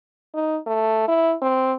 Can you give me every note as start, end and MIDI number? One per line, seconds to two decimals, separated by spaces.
0.34 0.58 63
0.66 1.07 57
1.07 1.34 64
1.42 1.74 60